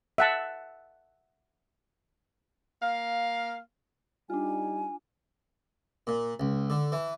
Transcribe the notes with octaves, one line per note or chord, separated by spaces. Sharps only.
E5 F#5 A5
A#3 F5
G3 D4 D#4 F4 G#5
A#2
C#2
D3
E3